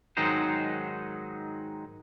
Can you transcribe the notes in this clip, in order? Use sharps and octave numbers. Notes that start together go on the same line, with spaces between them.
G#2 D#3 F#3 G#3 D#4 C5